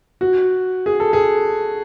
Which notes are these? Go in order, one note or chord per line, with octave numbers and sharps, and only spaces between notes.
F#4
G#4
A4
G#4